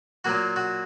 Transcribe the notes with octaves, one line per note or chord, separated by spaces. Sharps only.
A#2 F#3 A#3 F#4
F#4